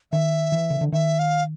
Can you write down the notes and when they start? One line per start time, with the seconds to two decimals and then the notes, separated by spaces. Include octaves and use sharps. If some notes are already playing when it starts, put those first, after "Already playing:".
0.12 D#3 E5
0.52 E3
0.70 C#3
0.81 D3
0.92 D#3 E5
1.19 F5